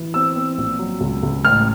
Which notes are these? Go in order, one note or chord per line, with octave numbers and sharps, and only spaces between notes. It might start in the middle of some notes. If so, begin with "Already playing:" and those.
Already playing: E3
C4 E6
C4
A#1
F#3
C#2
C#2
A1 F6